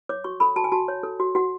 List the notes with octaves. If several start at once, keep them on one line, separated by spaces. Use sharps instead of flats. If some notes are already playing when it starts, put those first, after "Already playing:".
C#5 D6
F#4 C#6
A4 B5
F#4 A5
G#5
F#4 A5
C#5
A4
F#4
F#4 F#5